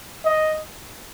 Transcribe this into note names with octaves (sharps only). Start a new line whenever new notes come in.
D#5